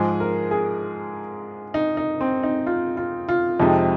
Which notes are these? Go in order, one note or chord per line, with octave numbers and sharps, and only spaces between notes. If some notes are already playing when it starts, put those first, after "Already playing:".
Already playing: G#2 F3 G#3 G#4
A#4
G#4
D#4
D#4
C4
D#4
F4
F4
F4
F2 C3 F3 G#3 D#4